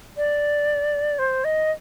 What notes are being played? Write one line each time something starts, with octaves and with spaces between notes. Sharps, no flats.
D5
C5
D#5